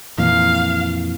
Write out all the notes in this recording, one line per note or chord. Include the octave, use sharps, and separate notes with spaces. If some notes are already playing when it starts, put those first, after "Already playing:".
F2 A#2 E3 F5